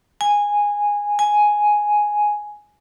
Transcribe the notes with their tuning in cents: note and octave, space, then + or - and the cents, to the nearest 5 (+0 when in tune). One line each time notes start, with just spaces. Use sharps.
G#5 -10
G#5 +5